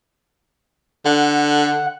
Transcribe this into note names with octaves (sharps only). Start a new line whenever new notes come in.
D3 F#5